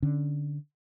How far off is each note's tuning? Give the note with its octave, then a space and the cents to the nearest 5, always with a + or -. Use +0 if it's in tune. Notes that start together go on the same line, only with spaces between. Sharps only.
D3 +0 C#4 -5